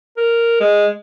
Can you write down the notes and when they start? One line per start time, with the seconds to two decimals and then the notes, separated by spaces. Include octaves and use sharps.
0.17 A#4
0.60 G#3